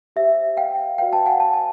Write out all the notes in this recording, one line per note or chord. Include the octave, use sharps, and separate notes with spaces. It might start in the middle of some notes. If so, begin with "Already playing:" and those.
G4 C5 E5
F5 G5
F#4 B4 D5 F5 G5
G5 A5
F#5 G#5
A5
G#5